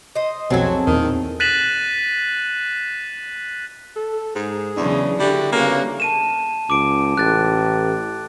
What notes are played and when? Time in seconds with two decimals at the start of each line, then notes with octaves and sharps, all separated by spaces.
0.15 C5 D#5
0.50 B1 F2 F#3 C4 G#4 A4 G#6
0.87 E2 A#2 D#3
1.40 F#6 A6 B6 D#7 E7 F#7
3.96 A4
4.36 G#2 G#4
4.77 E2 C#3 E3 F#3 D4
5.20 D3 G3 E4 F#4
5.52 C#3 G3 A#3 B3 F#4
6.00 A5 D#7 E7
6.70 C#2 D6 D7
7.17 A1 F#6 A6